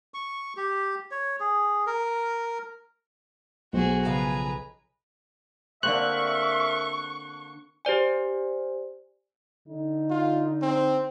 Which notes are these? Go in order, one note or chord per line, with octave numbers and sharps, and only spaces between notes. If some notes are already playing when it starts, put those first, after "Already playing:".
C#6
G4
C#5
G#4
A#4
B1 F#4 G#4 C5
C#3 F3 G#4 B4 F5 A#5
D3 A#3 C4 A#4 E5 C#6 F#6
G4 C5 D5 G#5
D3 D#4
F4
C4